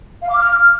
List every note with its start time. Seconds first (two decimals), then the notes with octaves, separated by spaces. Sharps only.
0.22 F5
0.29 D6
0.37 F6